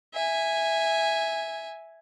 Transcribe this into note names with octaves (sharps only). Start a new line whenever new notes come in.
E5 G#5